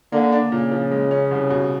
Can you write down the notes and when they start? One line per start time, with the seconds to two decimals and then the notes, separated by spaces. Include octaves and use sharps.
0.12 D3 A#3
0.32 D4
0.52 A#2 C#3
0.72 F3
0.92 G#3
1.11 C#4
1.31 C2
1.51 B2